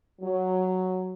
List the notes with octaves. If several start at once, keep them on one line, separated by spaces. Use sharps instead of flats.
F#3